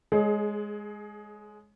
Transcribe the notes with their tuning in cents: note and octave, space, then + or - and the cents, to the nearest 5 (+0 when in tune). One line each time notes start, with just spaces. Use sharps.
G#3 +0 G#4 +30 C#5 +0